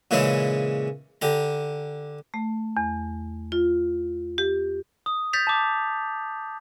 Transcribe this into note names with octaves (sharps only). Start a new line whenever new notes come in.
A#2 C#3 E3 G#3 C#4 E4
D3 G4 A#5
A3
E2
F4
G4
D#6
G6 A6 B6 F7
A5 D6